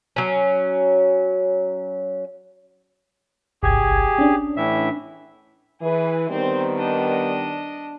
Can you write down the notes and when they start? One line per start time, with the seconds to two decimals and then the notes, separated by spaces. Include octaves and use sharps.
0.16 F#3 C#4
3.63 G1 C2 G4 G#4 G#6
4.18 C#4 D4
4.57 A2 E3 E5
5.81 E3 G#4 B4
6.29 D#3 G3 B3 C4 C5
6.76 D4 D#5